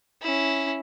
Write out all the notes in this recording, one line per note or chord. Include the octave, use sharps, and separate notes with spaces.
C#4 E4